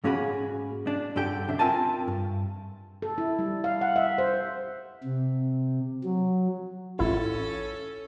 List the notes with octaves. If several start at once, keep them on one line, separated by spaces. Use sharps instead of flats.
G#2 A#3 C#4 F#4 G#4 B5
D4
G2 D3 G4 G5
B1 D4 E5
C4 F4 A#4 E5 G#5 A5
G2
A4
E4
G3
F5
F#5
E5
C5
C3
F#3
A1 C#4 E4 F4 A4